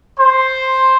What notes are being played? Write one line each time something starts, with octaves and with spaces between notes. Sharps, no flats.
C5